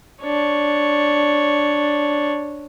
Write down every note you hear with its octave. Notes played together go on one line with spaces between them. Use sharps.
D4 C#5